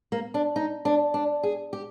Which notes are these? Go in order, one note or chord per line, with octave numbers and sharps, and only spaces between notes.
A#3
D4
D#4
D4
D4
G#4
G4